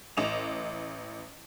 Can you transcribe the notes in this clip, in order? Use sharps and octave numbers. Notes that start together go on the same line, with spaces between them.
A1 D#5 E7 F7